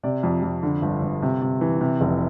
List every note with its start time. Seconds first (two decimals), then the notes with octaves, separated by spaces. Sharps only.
0.03 C3 D5
0.23 F2
0.43 F2
0.63 D3
0.82 G1
1.02 G1
1.22 C3
1.41 C3
1.61 E3
1.81 C3
2.01 F1